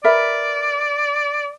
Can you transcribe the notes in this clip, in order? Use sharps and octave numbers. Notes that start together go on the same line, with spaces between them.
A#4 B4 D5 E5